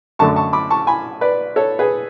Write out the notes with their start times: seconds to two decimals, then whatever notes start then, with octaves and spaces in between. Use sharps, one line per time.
0.19 F#2 D3 A3 A5 C#6
0.36 A5 C#6
0.53 B5 D6
0.70 A5 C#6
0.87 G#5 B5
1.21 B4 D5
1.56 A4 C#5
1.79 G#4 B4